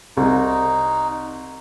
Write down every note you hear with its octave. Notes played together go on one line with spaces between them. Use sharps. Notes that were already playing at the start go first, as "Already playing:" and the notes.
C2 D#4